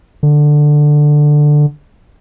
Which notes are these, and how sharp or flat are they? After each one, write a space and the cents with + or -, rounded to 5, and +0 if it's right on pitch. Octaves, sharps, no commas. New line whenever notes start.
D3 +10